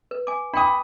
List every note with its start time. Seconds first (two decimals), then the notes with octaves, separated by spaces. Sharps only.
0.11 B4
0.27 G#5 D6
0.54 D4 G5 B5 D6 D#6